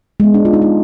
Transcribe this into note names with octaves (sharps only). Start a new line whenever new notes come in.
G#3
B3
D4
F4
D#4
F4